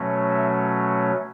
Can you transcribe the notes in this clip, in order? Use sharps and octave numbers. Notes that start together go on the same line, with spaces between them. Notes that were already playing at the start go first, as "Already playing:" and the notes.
Already playing: B2 F#3 A3 C#4
E5